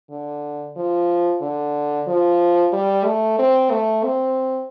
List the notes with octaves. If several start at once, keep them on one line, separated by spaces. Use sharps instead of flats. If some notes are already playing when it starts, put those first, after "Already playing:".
D3
F3
D3
F3
G3
A3
C4
A3
C4